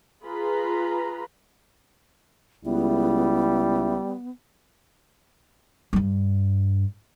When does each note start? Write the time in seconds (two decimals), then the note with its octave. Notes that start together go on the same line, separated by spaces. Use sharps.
0.24 F4 G#4 B4 A#5 B5
2.65 C#2 G3 B3 E4
5.93 G2 G3